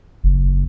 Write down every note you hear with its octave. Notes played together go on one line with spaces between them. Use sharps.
F#1